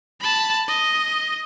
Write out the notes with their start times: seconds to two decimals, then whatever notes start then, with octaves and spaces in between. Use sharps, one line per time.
0.21 A5 B5
0.68 D#5